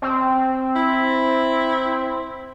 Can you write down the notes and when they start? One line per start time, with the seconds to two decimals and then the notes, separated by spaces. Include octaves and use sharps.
0.02 C4
0.75 E4